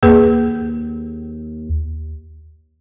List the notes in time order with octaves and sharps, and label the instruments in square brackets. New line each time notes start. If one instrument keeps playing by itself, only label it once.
[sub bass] D#2 [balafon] A#3 G#4 B4